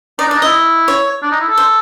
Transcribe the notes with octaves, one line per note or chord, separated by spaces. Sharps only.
D#4 D5
D4
D5
D#4
E4 D#5
C#5
D4
D#4
E4
A4
C5